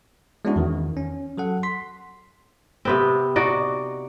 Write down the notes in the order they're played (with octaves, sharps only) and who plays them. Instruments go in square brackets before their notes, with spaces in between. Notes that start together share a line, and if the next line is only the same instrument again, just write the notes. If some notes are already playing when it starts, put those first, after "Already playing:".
[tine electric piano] G#3 B3 C#4 D4 E4 F#4
E2 D#3
C#4
F#3 A4 F#5
C6 B6
[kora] C3 B3 C4
D#4 F#4 D5